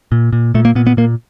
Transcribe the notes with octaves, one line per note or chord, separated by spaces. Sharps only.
A#2
A#2
A#2 A3
A#3
A#2 B3
B3
A#2 A#3